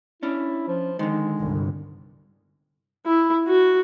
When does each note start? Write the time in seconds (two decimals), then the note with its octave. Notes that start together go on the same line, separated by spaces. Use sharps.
0.23 C#4 D4 E4
0.68 F3
0.99 D3 D#3 G#3
1.40 G1 C2
3.06 E4
3.47 F#4